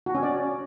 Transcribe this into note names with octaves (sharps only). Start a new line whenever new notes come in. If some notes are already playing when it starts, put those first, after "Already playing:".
F#4
C#4
D5